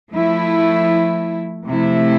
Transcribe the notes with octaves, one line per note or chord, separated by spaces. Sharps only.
F3 A3 E4
C3 F3 A3 E4